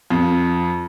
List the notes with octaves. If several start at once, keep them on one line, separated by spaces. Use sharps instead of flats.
F2